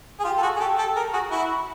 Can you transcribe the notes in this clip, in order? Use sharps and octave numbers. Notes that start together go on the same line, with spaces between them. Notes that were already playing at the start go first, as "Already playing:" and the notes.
G#4
F4 G4
A4
F#4 G#4
G#4
G4 A4
G4 A4
G#4 A#4
F#4 G#4
E4 F#4